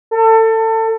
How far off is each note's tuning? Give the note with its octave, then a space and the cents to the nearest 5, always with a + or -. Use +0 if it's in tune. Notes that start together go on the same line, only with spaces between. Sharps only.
A4 +25